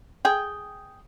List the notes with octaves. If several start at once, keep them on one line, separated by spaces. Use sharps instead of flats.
G#4 G5